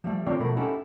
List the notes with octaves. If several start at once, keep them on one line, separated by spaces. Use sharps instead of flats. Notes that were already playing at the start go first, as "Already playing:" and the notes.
F3 G3 A3
D3 D#3 C4 F4 C#5 D5
B2 F3 A3 A#4 B5
C#4 D#4 E4 G4 A4 F#5